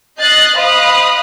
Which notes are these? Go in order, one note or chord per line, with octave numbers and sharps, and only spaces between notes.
D#5 F#6 G6 A6 C7
C5 D#5 F5 B5 D#6 F#6